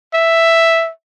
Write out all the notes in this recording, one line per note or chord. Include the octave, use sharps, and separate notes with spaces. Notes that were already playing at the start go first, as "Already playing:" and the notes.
E5